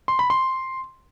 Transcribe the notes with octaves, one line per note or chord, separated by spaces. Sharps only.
C6
B5
C6